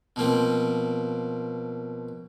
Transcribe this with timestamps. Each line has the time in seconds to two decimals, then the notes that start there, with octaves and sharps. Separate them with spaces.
0.16 B2 F3 A#3 C4